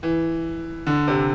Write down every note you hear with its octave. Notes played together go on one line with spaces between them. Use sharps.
E3
D3
C3